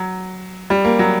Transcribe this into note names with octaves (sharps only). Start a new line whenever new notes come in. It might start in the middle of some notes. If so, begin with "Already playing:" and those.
Already playing: F#3
G3
A#3
F#3